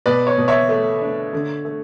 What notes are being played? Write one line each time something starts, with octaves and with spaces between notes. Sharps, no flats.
B2 B4 D5
C#5
B2
C#5 E5
A3
D4
D3
A3